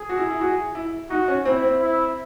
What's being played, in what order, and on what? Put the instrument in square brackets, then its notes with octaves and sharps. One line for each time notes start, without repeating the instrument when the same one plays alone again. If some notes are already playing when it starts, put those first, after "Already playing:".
Already playing: [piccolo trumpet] G#4
[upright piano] F#4
E4
E4
F#4
E4
[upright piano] D#4 [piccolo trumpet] F#4
[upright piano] C#4
[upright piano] C4 [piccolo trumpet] E4
[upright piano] C4
[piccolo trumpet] E4